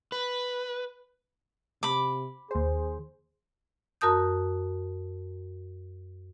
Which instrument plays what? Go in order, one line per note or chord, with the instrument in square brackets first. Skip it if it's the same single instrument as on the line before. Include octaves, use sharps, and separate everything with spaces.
[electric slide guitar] B4
[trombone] C3 [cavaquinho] B5 D6
[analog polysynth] D#2 C5 [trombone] G#4
[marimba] F#2 F#4 A#4 A5 D#6 G6